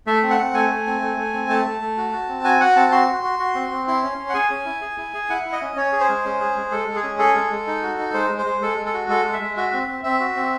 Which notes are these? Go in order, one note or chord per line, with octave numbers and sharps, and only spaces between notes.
A3 E5
C4
F#5
C4
A3 G#5
A3
C4
A3
A3
C4
A3 A5
A3
A3
F#4
F#4
C4
F#4 G#5
F#4 F#5
C4 A5
F#4 C6
F#4
F#4
F#4
C4
C4
E4 C6
C#4
C#4
F#5
G#4 G#5
C#4
E4
G#4
E4
G#4
E4 F#5
E4
D#5
C#4
C#4 C#5
G#4
C5
G#3
C#4
G#4
G#3
G#3 A4
G#3
G#4
C#4
G#4 A4
G#3
G#3
D#4
F#4
D#4
G#3 C5
G#3
C5
G#3
G#3 A4
G#3
A4
F#4
G#3 A4
G#3
E5
G#3
F#4 E5
C4
C4
C4 E5
F#4
C4